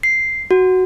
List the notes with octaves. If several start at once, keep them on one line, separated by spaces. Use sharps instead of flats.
C7
F#4